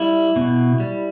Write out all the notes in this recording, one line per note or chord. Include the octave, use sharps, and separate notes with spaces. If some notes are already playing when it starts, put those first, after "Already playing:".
Already playing: G3 E4
B2
G3